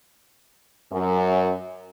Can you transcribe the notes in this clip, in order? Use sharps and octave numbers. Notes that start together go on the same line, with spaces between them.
F#2